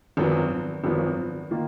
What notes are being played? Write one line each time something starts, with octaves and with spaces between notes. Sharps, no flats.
G#1 F#2 F3 B3
G#1 F#2 F3 B3
D#3 A#3 F4